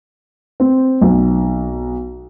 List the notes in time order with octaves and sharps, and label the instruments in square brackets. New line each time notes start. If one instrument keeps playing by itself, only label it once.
[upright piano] C4
B1